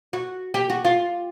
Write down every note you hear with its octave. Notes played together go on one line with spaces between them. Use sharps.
F#4
G4
F#4
F4